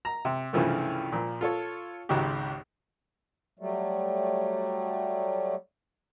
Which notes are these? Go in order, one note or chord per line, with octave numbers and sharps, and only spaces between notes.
A#5
C3
C2 G2 C#3 E3 F3 A3
A#2 F3
F4 A4 C#5
G#1 C#2 G#2 F#4 G4
F#3 G3 A3